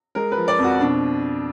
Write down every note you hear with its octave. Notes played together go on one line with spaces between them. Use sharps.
G#3 A#4
B4
F3
D5
F2
F#4
B2 D4